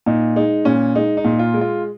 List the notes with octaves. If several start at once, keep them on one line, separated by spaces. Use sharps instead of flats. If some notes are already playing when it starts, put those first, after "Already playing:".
A#2 D#4
G#3 D#4
A#2 C#4
G#3 D#4
D#4
A#2
F4
G#3
F4